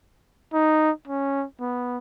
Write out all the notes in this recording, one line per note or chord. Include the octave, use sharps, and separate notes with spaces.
D#4
C#4
B3